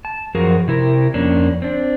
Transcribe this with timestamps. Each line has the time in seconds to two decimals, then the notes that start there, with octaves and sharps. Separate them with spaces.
0.05 A5
0.35 F#2 F3 F#4 G#4 A#4
0.68 C3 E4 A#4
1.14 F2 A#3 C#4 D4
1.62 C4 D4